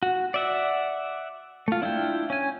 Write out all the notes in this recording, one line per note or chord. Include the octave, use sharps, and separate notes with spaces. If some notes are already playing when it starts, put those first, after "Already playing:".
F#4
D5 E5 F#5
A3 F4
D4 E4 F4 G5
C#4 G#5